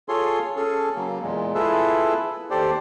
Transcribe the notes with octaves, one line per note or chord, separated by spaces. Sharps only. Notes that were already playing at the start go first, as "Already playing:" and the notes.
F4 G#4 A4 C#5 C6
C#4 G#4 A4
C#3 F#3 A#3
E2 A#2 G#3
E4 F4 G#4 A4 B4 E5
D#2 G4 A4 C5 D5